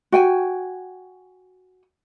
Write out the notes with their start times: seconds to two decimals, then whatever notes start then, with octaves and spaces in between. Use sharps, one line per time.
0.12 F#4 G5 G#5